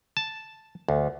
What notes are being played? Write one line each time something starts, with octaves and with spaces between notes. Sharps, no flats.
A5
D2